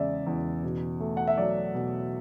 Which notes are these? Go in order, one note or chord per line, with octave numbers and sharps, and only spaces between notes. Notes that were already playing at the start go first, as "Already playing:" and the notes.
Already playing: E2 C#3 G#3 D5 E5
E2
B2
A3
F#5
E5
F#3 D5
B2